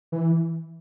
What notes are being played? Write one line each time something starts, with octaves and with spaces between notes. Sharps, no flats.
E3